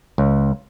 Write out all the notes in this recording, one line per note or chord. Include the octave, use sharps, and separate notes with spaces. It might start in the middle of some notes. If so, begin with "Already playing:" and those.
C#2